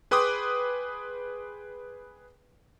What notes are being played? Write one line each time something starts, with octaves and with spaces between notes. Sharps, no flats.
G#4 B4 G5 C6 D6 D#6